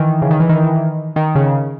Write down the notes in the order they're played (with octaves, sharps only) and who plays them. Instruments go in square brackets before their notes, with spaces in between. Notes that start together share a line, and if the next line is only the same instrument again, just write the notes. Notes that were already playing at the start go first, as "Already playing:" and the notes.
Already playing: [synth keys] D#3 E3
C#3
D#3
E3
D#3
D#3
C#3